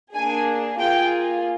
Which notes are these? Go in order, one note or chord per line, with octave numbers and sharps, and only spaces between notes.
A#3 D4 G#4 G#5
A#3 F4 G#4 G5